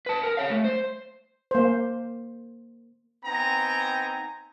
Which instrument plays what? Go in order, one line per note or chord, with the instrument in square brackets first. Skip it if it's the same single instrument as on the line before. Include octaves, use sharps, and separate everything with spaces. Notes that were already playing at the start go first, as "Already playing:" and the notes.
[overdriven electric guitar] B4 A5
A#4
C#5 F5
A3
C5
[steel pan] A#3 C5
[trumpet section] B3 C4 D#4 G5 G#5 A#5